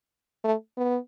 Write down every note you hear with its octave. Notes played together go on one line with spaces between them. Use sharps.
A3
B3